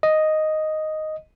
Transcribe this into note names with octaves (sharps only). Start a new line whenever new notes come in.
D#5